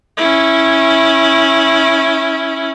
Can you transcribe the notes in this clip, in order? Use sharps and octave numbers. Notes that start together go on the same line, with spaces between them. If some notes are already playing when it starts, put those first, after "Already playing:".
C#4 E4